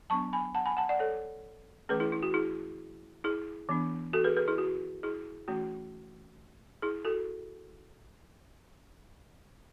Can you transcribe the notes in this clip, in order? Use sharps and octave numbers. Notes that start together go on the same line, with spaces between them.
F#3 B3 D4 A5 C#6
G#5 B5
F#5 A5
G#5 B5
F#5 A5
D5 F#5
A4 C#5
E3 A3 C#4 G#4 B4
E4 G#4
E4
F#4
E4 G#4
E4 G#4
E3 B3 D4
F#4 A4
G#4 B4
G#4 B4
E4 G#4
F#4
E4 G#4
E3 A3 C#4 F#4
E4 G#4
F#4 A4